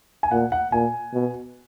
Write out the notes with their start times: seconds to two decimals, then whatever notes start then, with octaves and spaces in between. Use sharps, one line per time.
0.23 G#5
0.31 A#2 F#5
0.52 F#5
0.72 A#2 G#5
1.13 B2